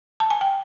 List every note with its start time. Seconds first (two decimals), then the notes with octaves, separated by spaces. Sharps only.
0.20 A5
0.30 G#5
0.41 G5